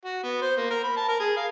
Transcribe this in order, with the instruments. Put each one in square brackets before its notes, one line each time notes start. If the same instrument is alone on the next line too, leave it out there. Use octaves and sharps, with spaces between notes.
[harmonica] F#4
B3
C5
A#3
A#4
B5
A5
A#4
G#4
F5